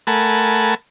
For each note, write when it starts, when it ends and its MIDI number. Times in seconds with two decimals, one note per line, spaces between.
0.07 0.75 57
0.07 0.75 70
0.07 0.75 78
0.07 0.75 80
0.07 0.75 81
0.07 0.75 83